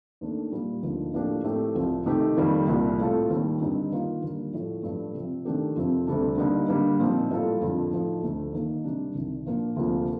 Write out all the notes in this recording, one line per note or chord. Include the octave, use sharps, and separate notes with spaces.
D#2 D#3 A3 D4
A#2 G3 A#3
D2 D3 F3 A#3 D#4
A2 F3 A#3 D4 G4
A2 A3 C4 G4
C2 C3 F3
C3 D#3 A3 D#4 G4
F2 D#3 G3 A#3
C2 A#2 G3
A2 A3 C4 F4 A4
D#2 D#3 G3
G2 D3 G3 C4 D#4
D#3 A#3 F4
D#2 D3 G3
A2 F3 A3
G2 F3 A3
C3 F3 C4
D#3 A3 D4 G4 A#4
F2 C3 F3 C4
D2 C3 G3 D4 A4
D3 G3 A#3 D#4
D3 G3 A#3 D4
A#2 F3 C4 D#4
A2 G3 A#3 F4 A4
F2 D3 F3
A2 F3 A3 D#4
D2 D3 A3
D#2 D#3 A#3 D#4
C3 G3 D4
C2 C3 D#3
A#2 F3 A#3 D4
D2 C3 F3 A#3 F4